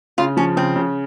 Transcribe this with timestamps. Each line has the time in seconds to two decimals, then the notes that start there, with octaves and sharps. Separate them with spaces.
0.18 C#3 F4
0.37 F3 C#4
0.57 C#3 C4
0.76 C#3